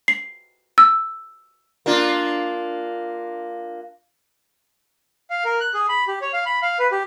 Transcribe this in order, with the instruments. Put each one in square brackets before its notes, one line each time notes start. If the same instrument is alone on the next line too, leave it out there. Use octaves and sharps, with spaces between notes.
[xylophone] C7
E6
[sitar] A#3 D4 F4
[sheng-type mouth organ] F5
A#4
F#6
G#4
B5
G4
C#5
F5
B5
F5
B4
G4